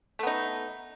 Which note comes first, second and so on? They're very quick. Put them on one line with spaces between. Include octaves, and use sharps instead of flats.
A3 B3 D#4